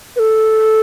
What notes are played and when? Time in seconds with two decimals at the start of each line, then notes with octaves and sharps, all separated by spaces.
0.16 B4
0.19 A4